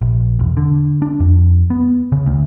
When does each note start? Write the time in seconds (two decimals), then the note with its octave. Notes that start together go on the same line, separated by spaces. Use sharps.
0.02 A#1
0.39 E1
0.57 D3
1.02 D4
1.20 F2
1.70 B3
2.12 C#3
2.26 D2